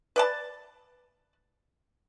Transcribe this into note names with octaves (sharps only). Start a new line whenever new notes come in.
B4 D5 A5